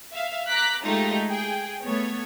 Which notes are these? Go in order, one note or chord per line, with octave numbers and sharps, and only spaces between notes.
E5 F5
A#5 D6 F#6 B6
G#3 A3 D#4 F4 G4
G#4 G5
A3 B3 C#5